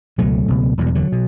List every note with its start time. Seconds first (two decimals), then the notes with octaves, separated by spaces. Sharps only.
0.18 C#2 B2 F#3 A3
0.48 C#2 B2
0.78 E1 E2 B2 F#3
0.87 G3
0.95 D3 F#3
1.12 B2